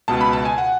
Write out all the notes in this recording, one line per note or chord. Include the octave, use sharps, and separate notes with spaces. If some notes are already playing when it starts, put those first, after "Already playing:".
C#2 B2 A5
B5
A5
G#5
F#5